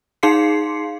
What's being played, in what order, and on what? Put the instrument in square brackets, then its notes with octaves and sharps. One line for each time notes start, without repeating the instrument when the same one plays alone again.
[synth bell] D#4 G#4 F5 C6 C7 C#7